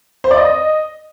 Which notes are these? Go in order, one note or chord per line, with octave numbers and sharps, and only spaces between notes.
C5
D5
D#5